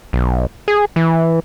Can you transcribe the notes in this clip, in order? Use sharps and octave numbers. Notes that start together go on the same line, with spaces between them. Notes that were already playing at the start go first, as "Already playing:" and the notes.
B1
G#4
E3